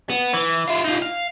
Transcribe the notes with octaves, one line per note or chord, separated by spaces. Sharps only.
B3
E3
E4 F4
D#4 F4
F5